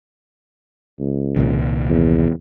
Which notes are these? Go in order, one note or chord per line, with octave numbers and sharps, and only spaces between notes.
C#2
C2 A#2 D#3
E2